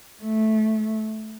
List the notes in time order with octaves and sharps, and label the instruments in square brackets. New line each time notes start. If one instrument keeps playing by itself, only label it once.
[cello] A3